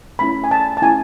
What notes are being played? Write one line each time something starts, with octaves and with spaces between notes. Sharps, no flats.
A3 C#4 E4 B5
G#5
A5
A5
A3 C#4 E4 G#5